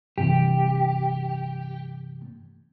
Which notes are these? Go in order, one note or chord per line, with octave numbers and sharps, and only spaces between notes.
G2 C3 E3 G4